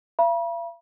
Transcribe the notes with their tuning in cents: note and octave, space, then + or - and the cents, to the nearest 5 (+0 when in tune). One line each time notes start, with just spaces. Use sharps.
F5 -45 B5 -45